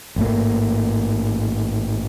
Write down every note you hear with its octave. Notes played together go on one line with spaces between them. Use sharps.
A1 G#2 A#3